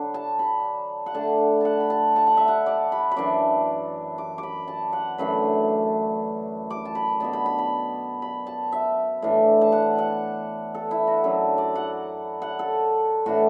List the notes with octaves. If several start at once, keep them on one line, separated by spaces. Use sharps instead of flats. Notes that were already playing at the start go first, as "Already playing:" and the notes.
Already playing: D3 F#3 D4 F#5 B5
A5
B5
F#5
D3 A3 D4 A5
F#5 A5
B5
A5
A5
F#5
E5
F#5
D5
B5
B5
F#2 E3 D4 D6
D6
D6
B5
A5
F#5
F#2 E3 A3 D4 B5
D6
A5
B5
B2 B3 D4 A5
B5
B5
B5
B5
A5
E5
A2 E3 D4
A5
F#5
F#5
A4
E4
F#4
F#2 F#3 D4 A4
D5
F#5
F#5
A4
A2 E3 D4 F#4